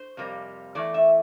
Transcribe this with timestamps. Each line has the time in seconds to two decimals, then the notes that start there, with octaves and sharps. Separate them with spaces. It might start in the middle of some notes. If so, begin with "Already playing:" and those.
Already playing: C5
0.17 F2 C3 G3 A#3
0.75 E2 E3 A3 D5
0.94 E5